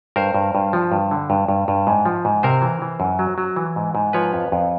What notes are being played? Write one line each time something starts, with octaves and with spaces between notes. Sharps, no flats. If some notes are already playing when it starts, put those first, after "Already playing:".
G2 A#4 C5
G2
G2
F3
G2
D3
G2
G2
G2
G#2
F3
G#2
C3 A#4 C5
E3
E3
F#2
F#3
F#3
E3
G#2
G#2
F3 B4 C#5
F2
F2